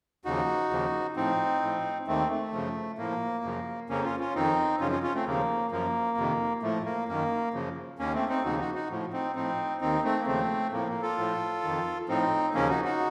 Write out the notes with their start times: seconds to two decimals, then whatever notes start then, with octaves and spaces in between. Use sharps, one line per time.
0.25 D#2 C#3 F3 D#4 F#4
0.70 D#2 C#3 F3
1.16 A2 F3 C4 D#4
1.62 A2 F3
2.07 D#2 D#3 A3 C4
2.30 A3
2.53 F#2 C#3 F3
2.98 A2 F3 A#3
3.44 F#2 C#3 F3
3.89 F2 C#3 F3 A#3 C#4
4.04 C#4 F4
4.20 C#4 F4
4.35 F2 D#3 C4 D#4
4.80 F#2 C#3 F3 C#4 F4
4.92 C#4 F4
5.03 C#4 F4
5.14 A3 C4
5.26 D#2 C#3 F3 A#3
5.71 F#2 F3 A#3
6.17 F2 C3 D#3
6.62 A2 F3 A3
6.85 A#3
7.08 F#2 D#3 A#3
7.54 F#2 C#3 F3
7.99 D#2 D#3 A#3 C#4
8.14 A3 C4
8.29 C4 D#4
8.44 D#2 C#3 F3 D#4 F#4
8.60 D#4 F#4
8.75 D#4 F#4
8.90 A2 F3
9.13 C4 D#4
9.35 A2 F3 C4 D#4
9.81 D#2 D#3 C4 D#4
10.04 A3 C4
10.19 A#3
10.26 D#2 C#3 F3 A3 C4
10.72 A2 F3 A#3
10.88 A#3
11.02 F4 A4
11.18 A2 F3
11.63 F2 D#3
12.08 A2 F3 C4 D#4
12.54 D#2 C#3 F3 A#3 C#4
12.69 D#4 F#4
12.84 D#4 F#4